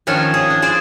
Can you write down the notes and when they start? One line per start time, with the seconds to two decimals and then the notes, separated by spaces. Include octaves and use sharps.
0.07 D#3 F3 C#4 D4 F4
0.34 G#4
0.50 D4
0.62 G#4 C5 D5